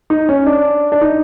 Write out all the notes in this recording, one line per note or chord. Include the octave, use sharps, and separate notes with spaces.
D#4
C#4
D4
D4
D#4